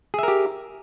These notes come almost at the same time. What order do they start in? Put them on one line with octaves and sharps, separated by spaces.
G#4 E5 A#4 G4